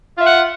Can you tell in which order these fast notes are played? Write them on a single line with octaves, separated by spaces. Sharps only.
F4 E5 F#5